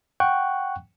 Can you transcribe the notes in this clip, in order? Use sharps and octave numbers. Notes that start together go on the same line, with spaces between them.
F#5 G5 C#6 F#6